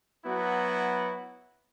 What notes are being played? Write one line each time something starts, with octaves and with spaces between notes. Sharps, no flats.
F#3 B3 E4 F#4